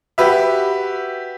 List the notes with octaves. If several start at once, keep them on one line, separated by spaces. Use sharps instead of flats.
F#4 G4 B4 E5